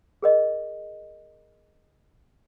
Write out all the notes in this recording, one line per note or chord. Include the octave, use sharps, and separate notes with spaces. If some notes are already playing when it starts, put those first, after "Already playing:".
G#4 A#4 D#5